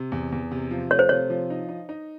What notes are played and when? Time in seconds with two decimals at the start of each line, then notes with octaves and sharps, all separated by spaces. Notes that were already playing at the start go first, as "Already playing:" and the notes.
Already playing: C3
0.12 E2
0.32 E2
0.52 C3
0.71 F3
0.90 A3 C#5
0.99 C5
1.09 C3 C#5
1.30 F3
1.50 D#4
1.69 D#4
1.89 D#4